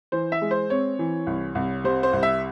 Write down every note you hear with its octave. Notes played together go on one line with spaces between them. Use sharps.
E3 C5
E5
G#3
C5
C4 C#5
E3
C2
C2
C3 C5
C5
C2
E5